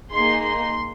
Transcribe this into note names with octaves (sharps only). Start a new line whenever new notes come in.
A#3 D#4 G#4 C6
C6